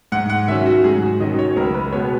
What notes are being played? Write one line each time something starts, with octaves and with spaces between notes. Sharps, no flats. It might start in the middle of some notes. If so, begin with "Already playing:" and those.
G#2 F#5
F#5
D#3 F#3 C#4 E5
F#4
G#2 G#4
F#4
D#3 F#3 C#4 D#5
C#5
C#2 A#4
B4
B2 G#3 B3 C#5